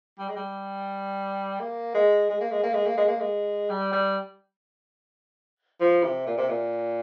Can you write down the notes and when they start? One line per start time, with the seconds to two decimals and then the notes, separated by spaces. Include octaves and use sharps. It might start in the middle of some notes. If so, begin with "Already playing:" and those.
0.19 G3
0.28 G#3
0.36 G3
1.60 A#3
1.94 G#3
2.30 G#3
2.41 A#3
2.52 G#3
2.64 A#3
2.74 G#3
2.86 A#3
2.98 G#3
3.08 A#3
3.20 G#3
3.69 G3
3.93 G3
5.80 F3
6.03 C3
6.26 A#2
6.38 C3
6.49 A#2